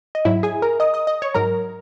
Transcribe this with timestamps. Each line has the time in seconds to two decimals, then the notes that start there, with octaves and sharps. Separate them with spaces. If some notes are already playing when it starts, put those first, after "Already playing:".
0.15 D#5
0.25 G#2 F#3 E4 E5
0.43 G#4 G#5
0.62 A#4 A#5
0.80 D#5 D#6
0.94 D#5 D#6
1.07 D#5 D#6
1.22 C#5 C#6
1.34 G#2 F#3 A#4 A#5